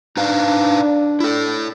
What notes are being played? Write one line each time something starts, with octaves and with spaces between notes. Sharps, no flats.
D4 D#4 B4 F5
E4 A4